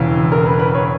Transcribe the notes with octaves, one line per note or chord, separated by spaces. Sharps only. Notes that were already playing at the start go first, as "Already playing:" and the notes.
Already playing: E1 E2 C#3
A#4
B4
B4
C#5